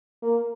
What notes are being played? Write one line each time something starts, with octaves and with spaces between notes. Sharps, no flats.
A#3